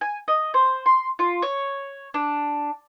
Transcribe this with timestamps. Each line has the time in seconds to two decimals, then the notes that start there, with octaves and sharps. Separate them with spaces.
0.01 G#5
0.28 D#5
0.54 C5
0.86 C6
1.19 F4
1.42 C#5
2.14 D4